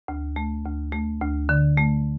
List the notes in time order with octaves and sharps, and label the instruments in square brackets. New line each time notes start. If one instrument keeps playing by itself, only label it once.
[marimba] D2
A3
D2
A3
D2
D3
A3